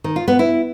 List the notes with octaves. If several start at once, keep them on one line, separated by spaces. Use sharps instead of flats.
D#3
F4
B3
E4